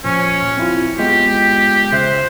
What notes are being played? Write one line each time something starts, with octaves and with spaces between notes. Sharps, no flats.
A#2 F3 C#4
C4 E4 F4
G#3 B3 F4 G4
C#3 C5 E5 F#6